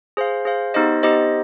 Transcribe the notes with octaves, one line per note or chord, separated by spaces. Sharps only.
G#4 C5 F5
G#4 C5 F5
B3 D#4 G4 C5 D#5
B3 D#4 G4 C5 D#5